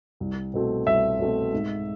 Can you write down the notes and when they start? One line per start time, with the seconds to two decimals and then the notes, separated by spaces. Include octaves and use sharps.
0.20 C2
0.54 B2 A3 C4
0.86 C2 E5
1.19 B2 A3 C4
1.53 G#2